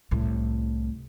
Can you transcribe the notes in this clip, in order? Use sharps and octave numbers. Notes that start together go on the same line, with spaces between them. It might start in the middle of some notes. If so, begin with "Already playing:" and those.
C2 A2